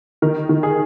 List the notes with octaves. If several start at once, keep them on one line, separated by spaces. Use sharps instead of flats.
D#3 A#4
D#3
G#4